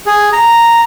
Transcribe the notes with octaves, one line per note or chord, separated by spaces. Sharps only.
G#4
A#5